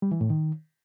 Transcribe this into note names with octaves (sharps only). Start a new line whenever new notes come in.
G3
E3
A2
D#3